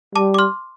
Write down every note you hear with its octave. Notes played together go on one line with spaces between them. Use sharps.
G3 A5 D6
D6
C6 F6